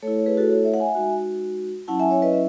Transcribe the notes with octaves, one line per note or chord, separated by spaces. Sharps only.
A3 A4 C#5
E4
C#5
G#4 B4
F#4 A4
A4 C#5
C#5 E5
F#5
E5 G#5
G#3 D#4 F#4
F#3 C#4 E4 F#5 A5
E5 G#5
C#5 E5
B4 D#5
E5